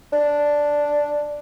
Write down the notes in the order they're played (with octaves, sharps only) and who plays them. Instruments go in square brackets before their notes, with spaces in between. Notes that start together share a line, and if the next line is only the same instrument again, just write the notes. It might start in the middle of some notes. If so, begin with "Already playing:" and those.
[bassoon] D4